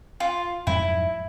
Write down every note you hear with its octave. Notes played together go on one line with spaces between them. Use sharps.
F4
F2 G#2 F#3 E4